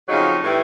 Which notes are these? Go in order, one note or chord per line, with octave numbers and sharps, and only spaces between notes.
F2 C#3 F#3 D#4
A2 E3 G3